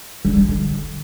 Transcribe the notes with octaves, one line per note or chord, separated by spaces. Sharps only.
G3
G#3
D3